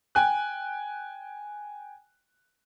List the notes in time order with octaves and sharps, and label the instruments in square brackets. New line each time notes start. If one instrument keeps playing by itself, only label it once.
[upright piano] G5 G#5 F#6